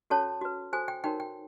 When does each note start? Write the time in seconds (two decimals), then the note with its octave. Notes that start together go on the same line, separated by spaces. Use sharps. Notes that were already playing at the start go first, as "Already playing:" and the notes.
0.10 C#4 F#4 A4 C#5 A5
0.41 F#4 B4
0.73 F#4 A4 C5 G#5
0.88 G5
1.04 D#4 F#4 A#4 C#5 G5
1.20 G5